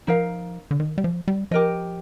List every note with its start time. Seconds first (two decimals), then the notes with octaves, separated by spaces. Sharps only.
0.07 F3 D#4 A#4 F5
0.71 D3
0.80 D#3
0.98 G3
1.04 F3
1.28 G3
1.51 F3 G4 A#4 D#5